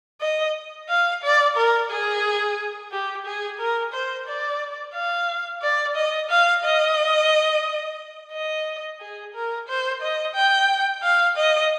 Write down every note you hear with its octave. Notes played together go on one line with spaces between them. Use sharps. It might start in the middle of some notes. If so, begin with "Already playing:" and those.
D#5
F5
D5
A#4
G#4
G4
G#4
A#4
C5
D5
F5
D5
D#5
F5
D#5
D#5
G#4
A#4
C5
D#5
G5
F5
D#5